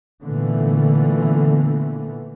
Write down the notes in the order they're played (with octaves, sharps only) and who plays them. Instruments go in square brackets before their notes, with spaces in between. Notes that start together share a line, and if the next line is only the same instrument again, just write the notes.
[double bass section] A#2 D3 E3 A3 B3